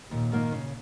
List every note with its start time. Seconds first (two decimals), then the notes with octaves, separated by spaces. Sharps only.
0.11 D#2 A#2
0.32 D#3 A#3 D#4
0.52 C#3